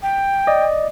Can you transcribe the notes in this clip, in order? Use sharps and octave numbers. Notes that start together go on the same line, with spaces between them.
G5
D5 D#5